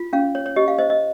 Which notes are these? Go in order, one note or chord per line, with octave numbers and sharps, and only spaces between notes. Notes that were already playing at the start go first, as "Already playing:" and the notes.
Already playing: F4
C#4 F5
C#5
C#5
G4 D#5
F5
C5 D#5
D#5